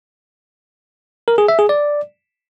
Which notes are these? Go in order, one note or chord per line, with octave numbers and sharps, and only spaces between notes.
A#4
G#4
E5
G#4
D5